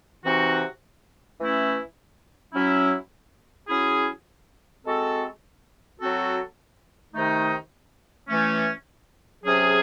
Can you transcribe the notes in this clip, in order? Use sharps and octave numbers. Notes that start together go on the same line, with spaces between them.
C3 E3 C4 D#4 F#4
E3 A3 C#4 E4
F#3 C#4 E4
F#3 C#4 E4 G#4
G#3 C4 F#4 A4
F#3 C4 F#4 A4
C3 D#3 A3 D#4
E3 A3 C#4
C3 F#3 C#4 G#4